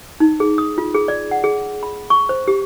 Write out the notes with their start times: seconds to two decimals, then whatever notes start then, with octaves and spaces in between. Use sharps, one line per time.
0.20 D#4
0.40 G#4
0.58 D#6
0.78 F4
0.95 G#4
1.08 D5
1.31 F#5
1.44 G#4
1.83 B5
2.10 C#6
2.29 C5
2.48 G4